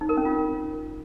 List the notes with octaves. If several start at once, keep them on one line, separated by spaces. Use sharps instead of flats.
D#4
A#4
C#4
F4